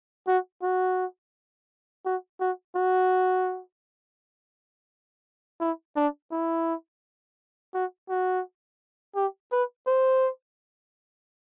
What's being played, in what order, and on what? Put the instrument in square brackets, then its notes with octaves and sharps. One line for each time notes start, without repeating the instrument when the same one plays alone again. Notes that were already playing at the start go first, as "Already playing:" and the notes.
[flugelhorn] F#4
F#4
F#4
F#4
F#4
E4
D4
E4
F#4
F#4
G4
B4
C5